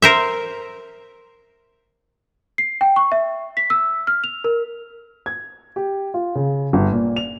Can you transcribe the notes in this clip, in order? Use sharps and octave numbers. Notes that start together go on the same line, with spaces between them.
A#4 C5 E5
C7
G5
C#6
E5
B6
E6
F6
F7
A#4
G#6
G4
F4
C#3
G1
A#2
F7